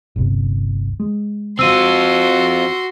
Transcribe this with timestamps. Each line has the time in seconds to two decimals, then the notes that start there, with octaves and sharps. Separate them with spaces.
0.16 G1 C2
1.00 G#3
1.59 C4 F4 F#4 C6 E6 D#7